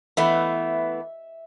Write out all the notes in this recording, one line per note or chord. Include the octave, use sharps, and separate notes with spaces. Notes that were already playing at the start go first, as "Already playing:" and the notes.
E3 A3 B3 E5